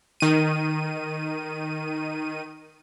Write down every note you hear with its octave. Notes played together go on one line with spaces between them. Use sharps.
D#3 D#7